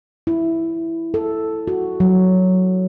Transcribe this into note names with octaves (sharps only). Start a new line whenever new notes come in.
E4
A4
F#4
F#3